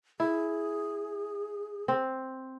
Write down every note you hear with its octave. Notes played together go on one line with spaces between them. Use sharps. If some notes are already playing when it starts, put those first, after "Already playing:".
E4 G#4
C4